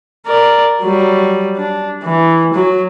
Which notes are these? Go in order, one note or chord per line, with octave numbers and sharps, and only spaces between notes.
A#4 D5
F#3 G3
D4
E3
F#3 F#4